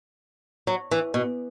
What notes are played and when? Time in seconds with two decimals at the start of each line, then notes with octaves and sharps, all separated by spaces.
0.67 F#3
0.91 E3
1.14 B2